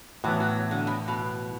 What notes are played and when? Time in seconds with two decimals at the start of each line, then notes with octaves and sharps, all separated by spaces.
0.24 A2 E3 F#3 B3
0.40 F#3
0.71 D3
0.87 B2
1.08 B2